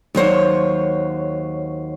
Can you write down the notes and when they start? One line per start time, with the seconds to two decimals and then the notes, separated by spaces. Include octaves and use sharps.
0.15 D#2 F#3 C5 C#5